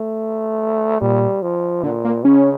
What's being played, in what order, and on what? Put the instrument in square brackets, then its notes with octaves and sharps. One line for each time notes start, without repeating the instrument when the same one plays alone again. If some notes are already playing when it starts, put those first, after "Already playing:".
Already playing: [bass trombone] A3
[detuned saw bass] A#2 [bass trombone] G3
[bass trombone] F3
[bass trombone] A#2 [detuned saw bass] D3
[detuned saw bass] A#3
[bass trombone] C#3 [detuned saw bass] C#4